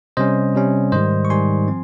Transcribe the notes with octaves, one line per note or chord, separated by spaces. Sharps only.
C3 G3 C#4 C5 D#5
C3 G3 C#4
G#2 D#3 G3 C5 D#5
C#6
G#2 D#3 G3 G#5 C6
F3 C4